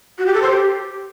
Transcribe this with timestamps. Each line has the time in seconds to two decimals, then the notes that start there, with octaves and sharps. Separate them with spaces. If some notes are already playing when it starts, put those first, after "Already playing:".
0.18 F#4
0.26 G4
0.34 A4
0.42 C5
0.49 G4